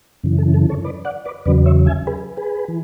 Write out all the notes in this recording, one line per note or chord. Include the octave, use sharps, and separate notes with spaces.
F#2 C#3 E3
A4
A4
A4 C#5
B4 D5
D5 F#5
B4 D5
E2 C#3 F#3 B4 D5
C#5 E5
E5 G#5
G#4 B4
G#4 B4
E3